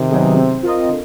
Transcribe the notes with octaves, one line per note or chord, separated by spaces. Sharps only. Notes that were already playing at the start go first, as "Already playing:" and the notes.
Already playing: C3 D#3
F#3 B3 D#4 G#4
C4
F4 A#4 D#5
D3